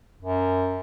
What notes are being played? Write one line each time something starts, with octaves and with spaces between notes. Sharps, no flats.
F#2